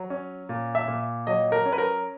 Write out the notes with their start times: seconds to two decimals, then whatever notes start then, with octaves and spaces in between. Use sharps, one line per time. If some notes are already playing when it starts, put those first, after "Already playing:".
Already playing: F#3
0.10 C#4
0.49 A#2
0.75 E5
0.88 A#2
1.27 F#3 D#5
1.52 A#4
1.65 C#4
1.73 B4
1.78 A#4